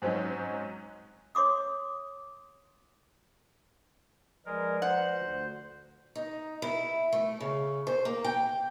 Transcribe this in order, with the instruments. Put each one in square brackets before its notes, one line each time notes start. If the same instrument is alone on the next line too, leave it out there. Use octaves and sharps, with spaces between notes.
[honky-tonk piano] G#2 F#3 C4 C#4 D#4
[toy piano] C#5 C6 D6 D#6
[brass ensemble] F3 B4 D5 [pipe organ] G#3 A#4
[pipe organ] C5 [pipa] F#5
[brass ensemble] D2
[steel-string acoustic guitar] D#4
E4
A3
C#3
C5
A#3
G5